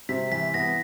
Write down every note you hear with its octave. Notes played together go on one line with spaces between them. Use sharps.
C3 B6
E3 B6
B3 A#6